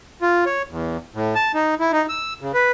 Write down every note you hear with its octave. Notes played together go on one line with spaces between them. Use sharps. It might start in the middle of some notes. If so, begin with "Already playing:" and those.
F4
C#5
E2
A2
A5
D#4
E4
D#4
E6
C#3
B4